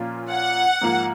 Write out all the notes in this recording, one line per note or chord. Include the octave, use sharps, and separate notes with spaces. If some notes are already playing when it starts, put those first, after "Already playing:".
Already playing: A#2 F3 A#3 C#4 F4
F#5
G#2 F3 A#3